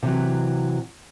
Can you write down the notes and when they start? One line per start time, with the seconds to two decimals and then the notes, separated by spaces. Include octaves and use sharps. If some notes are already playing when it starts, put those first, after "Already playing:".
0.03 C3 E3 F#3